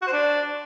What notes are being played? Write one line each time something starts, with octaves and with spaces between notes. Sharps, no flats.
F#4
C5
D4